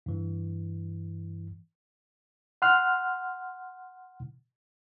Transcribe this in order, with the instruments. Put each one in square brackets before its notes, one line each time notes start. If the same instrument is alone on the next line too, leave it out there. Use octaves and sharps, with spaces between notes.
[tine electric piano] G2 E3
[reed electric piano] F#5 C6 F6 F#6